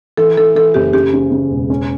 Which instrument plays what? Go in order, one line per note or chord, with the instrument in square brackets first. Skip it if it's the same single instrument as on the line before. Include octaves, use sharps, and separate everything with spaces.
[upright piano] E3 [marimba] A4
[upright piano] E3 [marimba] A4
[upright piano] E3 [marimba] A4
[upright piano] F#1 [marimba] G4
[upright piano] C#3 [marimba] G4
[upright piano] C#3
C#3
E1
C#4